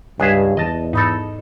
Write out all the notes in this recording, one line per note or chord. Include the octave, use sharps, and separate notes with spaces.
C#2 G2 G#4 E5 G#5 F#6 G#6
E2 E3 D#5 A5
G#2 D#4 A4 B5 A6